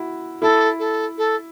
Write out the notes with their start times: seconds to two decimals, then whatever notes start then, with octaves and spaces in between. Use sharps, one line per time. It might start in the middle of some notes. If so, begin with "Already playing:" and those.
Already playing: E4 F#4
0.42 E4 A4
0.79 A4
1.18 A4